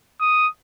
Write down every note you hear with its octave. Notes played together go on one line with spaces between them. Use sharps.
D#6